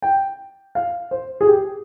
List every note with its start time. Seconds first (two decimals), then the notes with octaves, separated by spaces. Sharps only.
0.02 G5
0.75 F5
1.11 C5
1.41 G#4
1.47 G4